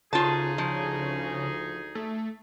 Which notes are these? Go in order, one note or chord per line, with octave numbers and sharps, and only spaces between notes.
D2 C#3 D#4 F4 G#4 A5
F3
A3